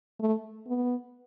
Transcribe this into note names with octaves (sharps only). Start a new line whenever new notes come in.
A3
B3